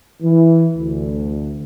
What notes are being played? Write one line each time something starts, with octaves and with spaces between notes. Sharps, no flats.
E3
D2